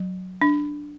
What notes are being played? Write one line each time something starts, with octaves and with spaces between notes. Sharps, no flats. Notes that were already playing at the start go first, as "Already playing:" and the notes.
Already playing: F#3
D4